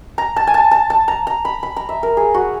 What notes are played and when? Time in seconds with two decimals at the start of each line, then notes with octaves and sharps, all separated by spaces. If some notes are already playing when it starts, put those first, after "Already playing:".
0.18 A#5
0.36 A5
0.47 G#5
0.54 A5
0.71 A5
0.90 A5
1.08 A#5
1.27 A#5
1.45 B5
1.63 B5
1.76 A#5
1.89 E5
2.03 A#4
2.17 G#4
2.34 F#4